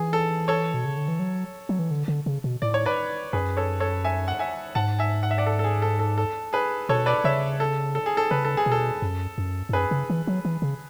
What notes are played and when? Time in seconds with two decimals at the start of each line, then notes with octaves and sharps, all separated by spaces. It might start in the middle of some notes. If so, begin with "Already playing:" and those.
Already playing: E3 G#4
0.13 A4
0.48 A4 C#5
0.74 B2
0.85 C#3
0.97 D3
1.08 E3
1.19 F#3
1.69 F#3
1.79 E3
1.91 D3
2.08 D3
2.26 C#3
2.44 B2
2.62 A2 D5
2.74 C#5
2.86 B4 D5
3.33 F#2 G#4 B4
3.57 A4 C#5
3.80 A4 C#5
4.04 E5 G#5
4.28 F#5
4.39 E5 G#5
4.75 G#2 F#5 A5
4.99 E5 G#5
5.23 F#5
5.31 E5
5.38 D5 F#5
5.46 A4
5.59 A4
5.64 G#4
5.82 A4
5.99 A4
6.18 A4
6.53 G#4 B4
6.89 B2 A4 C#5
7.06 B4 D5
7.24 C#3 C#5 E5
7.60 A4
7.95 A4
8.06 G#4
8.17 A4
8.31 C#3 B4
8.45 A4
8.57 G#4
8.66 B2
8.72 A4
9.02 F#2
9.38 F#2
9.69 G#2
9.73 F#2 G#4 B4
9.91 C#3
10.10 E3
10.27 F#3
10.45 E3
10.62 C#3